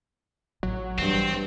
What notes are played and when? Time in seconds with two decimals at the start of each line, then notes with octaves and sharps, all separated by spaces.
0.63 A1 F#3
0.98 G2 E3 C4